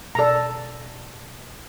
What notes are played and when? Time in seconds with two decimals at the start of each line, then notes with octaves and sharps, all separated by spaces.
0.15 B2 A4 D5 A#5